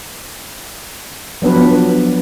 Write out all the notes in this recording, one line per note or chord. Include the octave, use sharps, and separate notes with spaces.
F3 F#3 B3 D4 B4